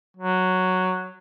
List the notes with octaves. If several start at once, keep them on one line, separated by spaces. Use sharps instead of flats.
F#3